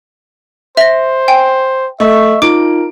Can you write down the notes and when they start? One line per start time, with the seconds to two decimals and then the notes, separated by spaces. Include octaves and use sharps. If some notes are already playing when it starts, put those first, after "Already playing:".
0.77 C5 E5 A#6
1.28 G5 G#5
2.00 A3 D#5 E5 C#6
2.42 D#4 F4 A#4 D6 D7